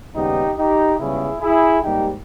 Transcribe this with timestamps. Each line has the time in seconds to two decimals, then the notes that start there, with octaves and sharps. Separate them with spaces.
0.13 D#2 C#3 G3 B3 D#4 G4
0.56 D#4 G4
0.98 C#2 C#3 G3 B3 E4 G#4
1.40 E4 G#4
1.83 G#2 G3 A#3 D#4 G4